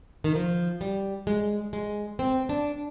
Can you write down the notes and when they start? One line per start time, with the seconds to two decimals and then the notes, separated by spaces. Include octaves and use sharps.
0.24 D#3
0.35 F3
0.81 G3
1.27 G#3
1.73 G#3
2.19 C4
2.49 D4